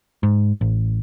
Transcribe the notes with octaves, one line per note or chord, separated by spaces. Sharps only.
G#2
A1